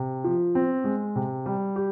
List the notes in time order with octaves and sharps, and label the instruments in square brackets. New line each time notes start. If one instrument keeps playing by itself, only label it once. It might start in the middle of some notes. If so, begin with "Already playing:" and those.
Already playing: [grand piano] C3
F3
C4
G#3
C3
G3
G4